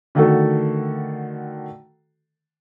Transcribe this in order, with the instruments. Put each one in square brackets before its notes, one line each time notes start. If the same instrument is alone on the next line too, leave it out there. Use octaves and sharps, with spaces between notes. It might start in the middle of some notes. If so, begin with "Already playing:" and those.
[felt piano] D3 D#3 A3 F#4 A4